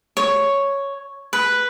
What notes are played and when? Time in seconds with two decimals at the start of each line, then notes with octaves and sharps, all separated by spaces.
0.17 C#5
1.33 B4